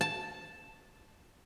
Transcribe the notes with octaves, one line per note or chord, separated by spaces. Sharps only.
A5